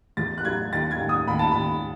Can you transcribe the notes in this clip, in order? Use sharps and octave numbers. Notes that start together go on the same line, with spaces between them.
E2 A6
F#6
F#3 G#6
D#2 A6
G#6
D#2
D#6
D#2 B5
A5
D#2 B5